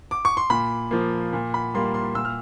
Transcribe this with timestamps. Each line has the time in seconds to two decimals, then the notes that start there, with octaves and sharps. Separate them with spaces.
0.11 D6
0.25 C#6
0.37 C6
0.50 A#2 B5
0.91 F3 A#3
1.33 A#2
1.54 B5
1.74 G3 A#3 C6
1.94 C6
2.15 A#2 E6
2.25 F6